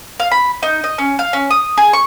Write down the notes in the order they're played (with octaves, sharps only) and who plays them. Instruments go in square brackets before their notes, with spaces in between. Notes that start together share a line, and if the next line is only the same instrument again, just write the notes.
[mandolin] F5
B5
D#4
D#5
C#4
F5
C#4
D#6
G#4
C#6